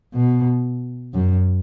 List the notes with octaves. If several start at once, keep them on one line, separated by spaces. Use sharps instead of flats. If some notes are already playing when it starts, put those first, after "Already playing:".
B2
F#2